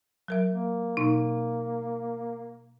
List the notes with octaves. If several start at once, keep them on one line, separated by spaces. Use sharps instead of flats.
F#3 A#4 E5
A#3
B2 A#3 D#4